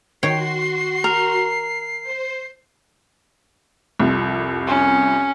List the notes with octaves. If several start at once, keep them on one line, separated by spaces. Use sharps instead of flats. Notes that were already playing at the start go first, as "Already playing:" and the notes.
D#3 F#4 C#5 G5 C6 C7
A#4
C5
C2 F2
C#4